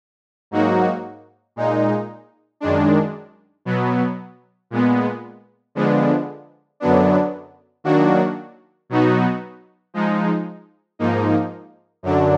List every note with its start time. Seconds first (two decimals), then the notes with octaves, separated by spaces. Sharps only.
0.51 G#2 F#3 A#3 D#4 F#4
1.56 A#2 G#3 D#4
2.60 F#2 D#3 G#3 D4
3.65 B2 F#3 B3
4.70 A#2 G#3 B3
5.75 D3 F3 G#3 B3 D4
6.80 F#2 D3 F#3 B3 D4
7.84 D#3 F#3 A#3 D4 F#4
8.89 B2 F#3 B3 D#4 F#4
9.94 F3 G#3 D#4
10.99 G#2 F3 A#3 D#4
12.03 F#2 D3 F#3 D4